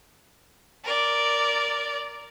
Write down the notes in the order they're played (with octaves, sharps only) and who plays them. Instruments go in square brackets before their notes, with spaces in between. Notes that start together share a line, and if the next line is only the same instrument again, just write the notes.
[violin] A#4 D5